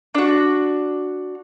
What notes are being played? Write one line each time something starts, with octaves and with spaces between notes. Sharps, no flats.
D4 F#4